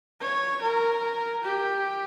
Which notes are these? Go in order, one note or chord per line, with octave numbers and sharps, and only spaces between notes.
C#5
A#4
G4